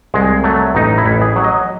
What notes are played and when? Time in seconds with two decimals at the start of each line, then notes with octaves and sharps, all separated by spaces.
0.14 C2 G#3
0.44 F#3 A3
0.75 A1 D#4
0.98 E4
1.06 A1
1.21 G#4
1.36 F#3
1.44 D#5